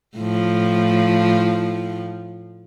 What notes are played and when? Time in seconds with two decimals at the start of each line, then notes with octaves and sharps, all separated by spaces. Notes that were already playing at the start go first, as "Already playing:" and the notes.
0.17 A2 F3